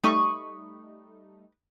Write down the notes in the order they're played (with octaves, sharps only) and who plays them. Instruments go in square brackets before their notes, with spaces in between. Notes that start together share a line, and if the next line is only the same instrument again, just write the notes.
[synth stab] G3 A3 D#4 [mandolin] B4 C#6 D#6